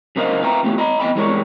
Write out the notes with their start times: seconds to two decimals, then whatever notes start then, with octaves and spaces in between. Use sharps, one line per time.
0.16 C#3 F#3 A#4 C5 D#5 F5
0.43 B4 E5 F5 G5 A#5
0.63 E2 A3 F4 G4
0.78 D#5 A#5 B5
0.99 E2 A#3 D#5 G5 B5
1.15 E3 G3 G#3 A#4 C5 C#5